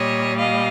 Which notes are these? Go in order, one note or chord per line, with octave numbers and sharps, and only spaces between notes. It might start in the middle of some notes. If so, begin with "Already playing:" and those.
Already playing: A#2 G3 C#5 D#5
D#5 F5